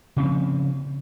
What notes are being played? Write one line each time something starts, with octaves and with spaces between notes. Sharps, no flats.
C#3 F3 C4